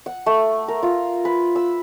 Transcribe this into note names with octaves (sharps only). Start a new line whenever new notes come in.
F#5
A3
A#4
F4
B4
E6